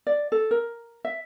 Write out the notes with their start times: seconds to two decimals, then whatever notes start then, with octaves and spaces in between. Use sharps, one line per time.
0.07 D5
0.32 A4
0.51 A#4
1.05 E5